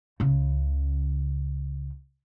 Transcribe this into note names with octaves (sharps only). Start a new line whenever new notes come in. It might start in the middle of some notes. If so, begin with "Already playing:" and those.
C#2 C#3